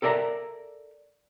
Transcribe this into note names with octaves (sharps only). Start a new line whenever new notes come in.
A4 A#4 D5 E5 A#5